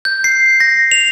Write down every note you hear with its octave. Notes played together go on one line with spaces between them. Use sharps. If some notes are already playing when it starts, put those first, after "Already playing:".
G6
C7
A#6
F7